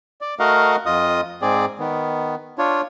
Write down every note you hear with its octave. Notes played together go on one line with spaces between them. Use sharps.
D5
A3 F#4 A#4 D#5 F5 F#5
F2 F4 D#5 D#6
G#2 C4 G#4 D5
D#3 B3
D4 F4 C#5